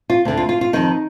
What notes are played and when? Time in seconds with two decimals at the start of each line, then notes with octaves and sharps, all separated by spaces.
0.10 F4
0.25 D2 D3
0.37 F4
0.49 F4
0.61 F4
0.73 F2 D#3 D#4